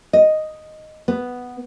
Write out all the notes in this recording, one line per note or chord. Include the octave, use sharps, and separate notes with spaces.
D#5
B3